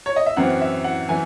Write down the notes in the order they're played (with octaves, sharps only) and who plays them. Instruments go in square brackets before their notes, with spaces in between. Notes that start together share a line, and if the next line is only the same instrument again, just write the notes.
[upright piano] C#5
D#5
E5
F#2 E3 C4 F#5
E5
F#5
E3 G#5